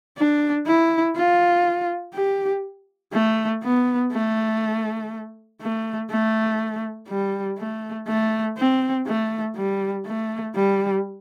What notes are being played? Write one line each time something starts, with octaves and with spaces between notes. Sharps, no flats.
D4
E4
F4
G4
A3
B3
A3
A3
A3
G3
A3
A3
C4
A3
G3
A3
G3